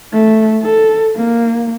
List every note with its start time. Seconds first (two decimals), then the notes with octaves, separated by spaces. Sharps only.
0.13 A3
0.63 A4
1.15 A#3